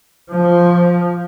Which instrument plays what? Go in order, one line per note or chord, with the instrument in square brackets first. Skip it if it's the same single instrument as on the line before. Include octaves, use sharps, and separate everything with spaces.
[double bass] F3